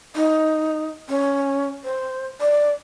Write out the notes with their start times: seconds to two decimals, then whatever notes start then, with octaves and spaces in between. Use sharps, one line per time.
0.16 D#4
1.09 C#4
1.84 C5
2.41 D5